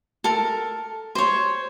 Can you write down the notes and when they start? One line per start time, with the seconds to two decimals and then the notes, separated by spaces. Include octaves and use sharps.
0.24 A4 A#4
1.15 C5 C#5